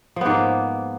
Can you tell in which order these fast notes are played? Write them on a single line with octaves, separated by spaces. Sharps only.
F3 B3 G#2 A#3